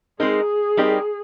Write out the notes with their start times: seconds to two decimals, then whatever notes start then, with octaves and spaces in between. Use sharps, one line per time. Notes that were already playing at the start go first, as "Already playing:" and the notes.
0.20 G#3 C4 D#4 G#4 A#4
0.77 G3 C4 D#4 G4 A#4